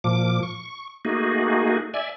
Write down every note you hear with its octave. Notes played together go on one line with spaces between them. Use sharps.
A#2 F3 D6
C#6
A3 A#3 D#4 F#4 G#4
D5 E5 G#5